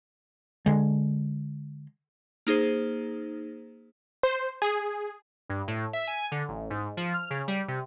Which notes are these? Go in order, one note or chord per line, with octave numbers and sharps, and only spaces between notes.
D3 G#3
A#3 D#4 G#4 C5
C5
G#4
G2
A2
E5
G#5
D3
A1
G#2
F3
F6
C#3
G3
C3